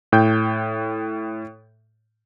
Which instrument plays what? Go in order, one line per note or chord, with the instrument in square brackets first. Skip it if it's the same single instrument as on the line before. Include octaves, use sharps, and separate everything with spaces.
[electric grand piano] A2 G5 G6